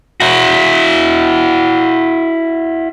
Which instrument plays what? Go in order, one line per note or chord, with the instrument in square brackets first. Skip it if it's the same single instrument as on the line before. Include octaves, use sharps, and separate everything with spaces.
[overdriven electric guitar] E4 F#4